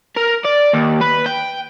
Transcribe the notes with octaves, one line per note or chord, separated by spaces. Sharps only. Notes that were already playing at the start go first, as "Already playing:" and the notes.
A#4
D5
D#2
B4
G5